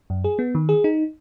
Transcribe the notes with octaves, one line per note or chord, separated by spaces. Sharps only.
F#2
G#4
B3
D#3
G#4
D#4